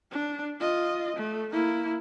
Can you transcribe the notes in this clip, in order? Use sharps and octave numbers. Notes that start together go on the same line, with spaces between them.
D4
F4 D#5
A3
A#3 E4